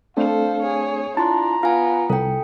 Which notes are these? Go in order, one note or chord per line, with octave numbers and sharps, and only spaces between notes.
A3 C4 D4 A4 C5 F5
G#4 C#5
D4 E4 F4 A5 A#5 C6
B3 F4 F5 G#5
C2 A4 G5